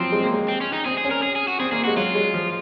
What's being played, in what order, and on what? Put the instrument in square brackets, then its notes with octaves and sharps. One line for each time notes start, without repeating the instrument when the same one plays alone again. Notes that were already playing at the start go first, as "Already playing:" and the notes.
Already playing: [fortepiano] F3 F#3 [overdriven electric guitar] C4
[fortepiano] G#3
A#3
G#3
[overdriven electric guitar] C4
C#4
D#4
[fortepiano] C4 [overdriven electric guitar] G#4
[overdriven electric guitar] G#4
[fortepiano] C#4
[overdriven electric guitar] A#4
G#4
G#4
F#4
[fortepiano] C4 [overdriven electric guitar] G#4
[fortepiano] A#3 [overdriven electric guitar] G#4
[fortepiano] G#3 [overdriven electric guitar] F#4
[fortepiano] F#3 [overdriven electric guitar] F4
[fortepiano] G#3
F3